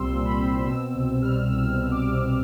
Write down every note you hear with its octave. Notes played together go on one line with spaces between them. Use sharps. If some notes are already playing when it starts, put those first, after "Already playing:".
Already playing: C2 A#2 G3 C4 C6 E6
A#2
B5
C4
B2 E6
C2
G3 F6
C2 E6
B2
D6
C2